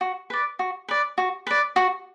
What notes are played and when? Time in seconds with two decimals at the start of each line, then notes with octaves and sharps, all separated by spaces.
0.01 F#4
0.30 B4 D5
0.59 F#4
0.88 B4 D5
1.18 F#4
1.47 B4 D5
1.76 F#4